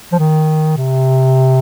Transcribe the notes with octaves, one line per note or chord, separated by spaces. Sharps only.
F3
D#3
C3